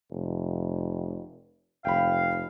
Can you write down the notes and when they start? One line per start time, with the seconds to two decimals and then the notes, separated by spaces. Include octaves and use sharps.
0.11 F1
1.85 F1 F5 G5 B5